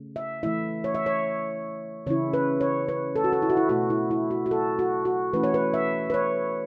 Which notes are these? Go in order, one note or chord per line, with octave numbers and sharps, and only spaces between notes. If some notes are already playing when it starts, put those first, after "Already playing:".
Already playing: C#3 A3
E5
E3 A3 E4 E5
C#5
E5
C#5
C#3 E3 C#4 E4 C#5
B4
C#5
B4
A4
F#4
A4
E4
F#4
E4
B2 A3 E4 F#4
E4
E4
F#4
F#4
A4
F#4
F#4
E3 A3 C#4 E4 B4
C#5
B4
E5
B4
C#5